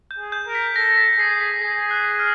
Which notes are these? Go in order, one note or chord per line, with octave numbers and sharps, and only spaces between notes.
G6
G#4
G6
A#4
B6
A4 A#6
B6
G#4 C7
B6
G#4 A#6
F#6
F6